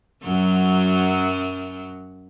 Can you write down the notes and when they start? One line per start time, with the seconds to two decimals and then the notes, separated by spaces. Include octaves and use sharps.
0.23 F#2 F#3